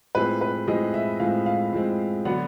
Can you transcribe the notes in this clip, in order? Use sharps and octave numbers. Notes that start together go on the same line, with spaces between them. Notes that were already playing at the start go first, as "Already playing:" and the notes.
A2 F3 G#3 C4 B4
B4
A2 F3 G#3 C4 D#5
E5
A2 F3 G#3 C4 F5
F5
A2 F3 G#3 C4
D3 F#3 B3 F#5